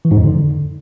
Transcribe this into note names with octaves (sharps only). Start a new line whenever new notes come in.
E3
G#2
F2
D3